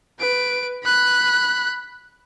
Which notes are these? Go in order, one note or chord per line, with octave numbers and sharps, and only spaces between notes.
B4 D7
B5 F#6